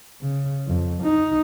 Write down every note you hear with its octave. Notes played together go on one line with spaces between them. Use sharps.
C#3
F2
D#4